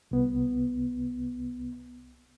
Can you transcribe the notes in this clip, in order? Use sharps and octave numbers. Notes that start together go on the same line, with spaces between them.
C2 B3